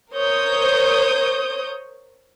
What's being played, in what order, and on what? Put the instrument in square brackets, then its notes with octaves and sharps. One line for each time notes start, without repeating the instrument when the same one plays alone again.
[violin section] A#4 C5 C#5 D#6 G6